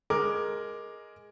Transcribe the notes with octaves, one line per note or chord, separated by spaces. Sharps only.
G#3 A#4 D6